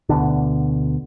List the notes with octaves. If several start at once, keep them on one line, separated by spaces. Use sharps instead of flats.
D2 B2 D3